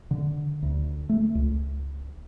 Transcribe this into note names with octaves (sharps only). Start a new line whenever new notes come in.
D3
D2
A3
C#2